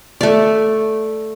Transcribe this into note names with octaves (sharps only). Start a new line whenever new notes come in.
A3 D5